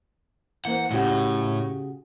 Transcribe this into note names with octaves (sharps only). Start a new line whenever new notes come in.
E3 A#3 C5 F#5
A2 C#3 F#4 G4